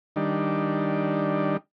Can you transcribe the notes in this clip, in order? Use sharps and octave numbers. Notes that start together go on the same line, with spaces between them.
D#3 G3 D4